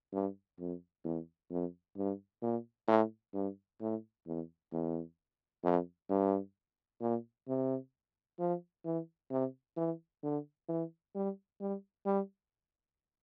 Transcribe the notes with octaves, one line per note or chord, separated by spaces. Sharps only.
G2
F2
E2
F2
G2
A#2
A2
G2
A2
E2
E2
F2
G2
A#2
C3
F3
E3
C3
E3
D3
E3
G3
G3
G3